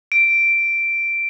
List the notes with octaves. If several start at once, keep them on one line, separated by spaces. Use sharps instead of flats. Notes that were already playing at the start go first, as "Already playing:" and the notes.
D7